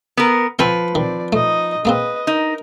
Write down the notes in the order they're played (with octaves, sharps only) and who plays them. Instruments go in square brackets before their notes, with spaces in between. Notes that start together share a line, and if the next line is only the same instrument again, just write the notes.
[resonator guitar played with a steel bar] B3 A#4
[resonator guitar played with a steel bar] F3 B4 [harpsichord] C4
[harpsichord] D#3 [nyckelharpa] C4 D5
[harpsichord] A3 [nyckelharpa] D#4 D#5
[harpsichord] G#3 A#3 C4 [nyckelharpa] B4 D#5
[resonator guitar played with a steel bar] D#4 [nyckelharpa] A#4